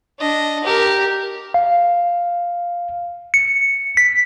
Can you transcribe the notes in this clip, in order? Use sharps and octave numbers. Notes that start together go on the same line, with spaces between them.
D4 D#5
G4 A#4
F5
C#7
B6